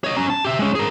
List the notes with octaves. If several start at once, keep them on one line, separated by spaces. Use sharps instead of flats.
C#5 D#5
C#4 A#5
A5
G4 E5
G#3 C#4
G#4 A#4